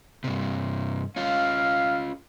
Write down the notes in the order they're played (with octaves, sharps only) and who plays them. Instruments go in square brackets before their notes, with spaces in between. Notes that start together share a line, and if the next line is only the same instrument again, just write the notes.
[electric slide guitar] G2 C3
[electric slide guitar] C#4 F4 [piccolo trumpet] F5